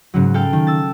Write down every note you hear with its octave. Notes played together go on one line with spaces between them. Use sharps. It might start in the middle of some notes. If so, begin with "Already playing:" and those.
G#2 C#3 F#3
A4 F5 G5
D#3
E6 A6